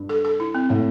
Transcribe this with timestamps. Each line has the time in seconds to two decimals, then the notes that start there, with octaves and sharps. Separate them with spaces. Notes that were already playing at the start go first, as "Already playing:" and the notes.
Already playing: G2
0.09 A4
0.25 A4
0.40 E4
0.55 C4
0.69 A2 A#3